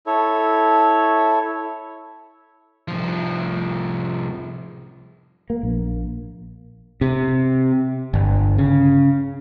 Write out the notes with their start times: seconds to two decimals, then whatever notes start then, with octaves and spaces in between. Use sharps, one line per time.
0.07 E4 A4 C#5
2.88 C2 F3
5.50 A#3
5.63 A#1
7.01 C3
8.14 G1
8.58 C#3